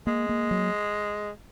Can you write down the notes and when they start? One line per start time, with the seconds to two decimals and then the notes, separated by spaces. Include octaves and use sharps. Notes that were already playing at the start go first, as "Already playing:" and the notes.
0.07 G#3 A#3
0.29 A#3
0.51 F#3